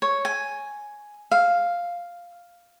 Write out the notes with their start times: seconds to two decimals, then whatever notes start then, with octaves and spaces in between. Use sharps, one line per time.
0.02 C#5
0.25 G#5
1.32 F5